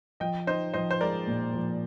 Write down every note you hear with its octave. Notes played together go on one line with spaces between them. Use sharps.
F3 D#5 G5
D#4 C5 D#5
F3 C5 D#5
C5
G#3 A#4 D5
A#2
F3